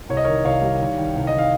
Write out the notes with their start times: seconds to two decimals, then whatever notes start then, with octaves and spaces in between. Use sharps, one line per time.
0.09 C2 C#5
0.17 D#5
0.24 D#3 A#4 C#5
0.44 C2 C#5 F5
0.62 G3
0.80 D#3
0.98 D#3
1.15 C2
1.27 D#5
1.33 D#3
1.38 F5